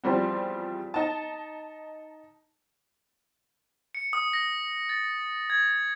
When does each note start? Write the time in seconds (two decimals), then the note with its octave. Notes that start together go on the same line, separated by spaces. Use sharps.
0.04 E2 F3 G3 C4
0.94 D#4 A5
3.95 C#7
4.13 D#6
4.33 A#6
4.89 A6
5.50 G#6